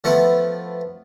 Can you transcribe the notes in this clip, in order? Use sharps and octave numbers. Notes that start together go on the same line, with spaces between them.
F3 A3 B3 E4